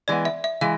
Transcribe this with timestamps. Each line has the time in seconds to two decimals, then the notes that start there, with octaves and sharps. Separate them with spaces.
0.08 E3 G#3 B3 D5
0.25 E5
0.44 E5
0.61 E3 G#3 F5